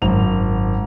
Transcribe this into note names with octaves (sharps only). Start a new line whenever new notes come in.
G#1 F#2 F7